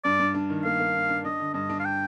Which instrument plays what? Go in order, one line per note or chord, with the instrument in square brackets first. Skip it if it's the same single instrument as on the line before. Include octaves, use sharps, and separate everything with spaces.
[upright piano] G2 [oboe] D5
[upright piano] G2
D4
D#3
[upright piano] A#3 [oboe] F5
[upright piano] A#3
D4
D4
[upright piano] D4 [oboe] D#5
[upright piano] D3
[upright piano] G2 [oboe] D#5
[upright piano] D4
[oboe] F5
G5